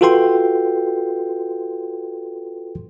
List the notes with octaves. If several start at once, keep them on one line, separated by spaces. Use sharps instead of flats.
F4 F#4 A4 B4 G5 C6